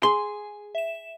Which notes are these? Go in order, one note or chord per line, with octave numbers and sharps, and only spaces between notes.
G#4 G#5 C6
E5 E7